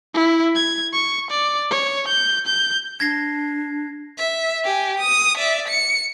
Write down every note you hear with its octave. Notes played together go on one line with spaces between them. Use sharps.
E4
G#6
C#6
D5
C#5
G6
G6
D4 G#6 A#6 C7
E5
G4 G#5
D#6
D5 E5
C#7